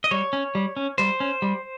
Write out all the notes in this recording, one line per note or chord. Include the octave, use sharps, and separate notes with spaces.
D#5
G3 C#5
C#4
G3
C#4
G3 C5
C#4
G3